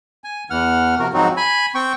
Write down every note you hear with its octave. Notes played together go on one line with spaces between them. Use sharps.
G#5
E2 E3 F#5 F6
C3 F3 F#4 A#4
G#2 F3 F#3 C4 D#4 F#4
G#5 B5
C4 G5 C#6